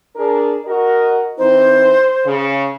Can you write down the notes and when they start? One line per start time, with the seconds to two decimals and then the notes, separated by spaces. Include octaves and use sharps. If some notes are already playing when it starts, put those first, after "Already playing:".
0.16 D4 G#4 A#4
0.65 F#4 A#4 D#5
1.38 E3 C4 D#4 C5
2.26 C#3